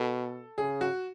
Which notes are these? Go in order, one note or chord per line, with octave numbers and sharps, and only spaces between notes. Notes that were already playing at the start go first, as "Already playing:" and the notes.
Already playing: B2 A4
C#3 G#4
F#4